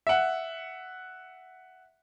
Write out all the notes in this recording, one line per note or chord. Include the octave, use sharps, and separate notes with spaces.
E5 F#5